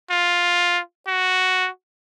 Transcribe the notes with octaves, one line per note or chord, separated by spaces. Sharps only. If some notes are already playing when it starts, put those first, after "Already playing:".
F4
F#4